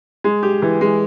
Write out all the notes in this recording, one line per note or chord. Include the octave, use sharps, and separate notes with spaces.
G#3
G4
E3
G#3